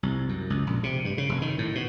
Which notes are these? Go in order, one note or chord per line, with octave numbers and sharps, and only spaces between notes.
C2
F#2
C#2
A#1
C3
G2
C#3
F1
D#3
A2
B2